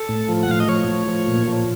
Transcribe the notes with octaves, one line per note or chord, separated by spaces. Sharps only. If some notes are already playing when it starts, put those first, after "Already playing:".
Already playing: A4
A2
F3
F#5
A2 F5
D#5
F3 C#5
A2
F3
A#2
F3